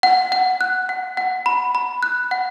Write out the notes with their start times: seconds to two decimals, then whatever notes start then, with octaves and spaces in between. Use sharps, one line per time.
0.03 F#5
0.32 F#5
0.61 F#6
0.89 F#5
1.17 F#5
1.46 B5
1.75 B5
2.03 F#6
2.31 F#5